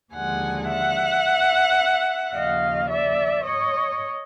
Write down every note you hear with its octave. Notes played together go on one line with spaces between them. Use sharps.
D#2 D3 F3 G#3 F#5 G#5
E5 F#5
D#2 C#3 F3 D#5 F5
D5 E5
C#5 D#5